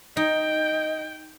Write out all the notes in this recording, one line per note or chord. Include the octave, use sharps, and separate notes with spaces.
D#4 D#5 G5